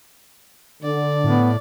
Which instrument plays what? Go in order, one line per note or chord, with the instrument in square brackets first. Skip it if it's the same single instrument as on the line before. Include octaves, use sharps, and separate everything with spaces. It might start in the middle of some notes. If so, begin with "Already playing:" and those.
[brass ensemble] D3 [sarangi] D5
[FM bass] A2 [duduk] B3